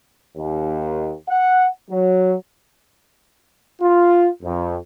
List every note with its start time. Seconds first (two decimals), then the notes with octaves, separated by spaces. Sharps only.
0.37 D#2
1.28 F#5
1.90 F#3
3.81 F4
4.42 F2